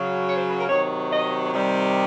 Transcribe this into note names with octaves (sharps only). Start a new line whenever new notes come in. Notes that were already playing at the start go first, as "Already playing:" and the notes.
Already playing: C#3 F#3
C#5
C5
B4
A#4
C3 D#3 F#3 C#5
D#5
C3 D#3 G3